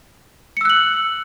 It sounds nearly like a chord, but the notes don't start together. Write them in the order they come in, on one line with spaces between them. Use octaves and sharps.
C#7 E6 F#6 F#7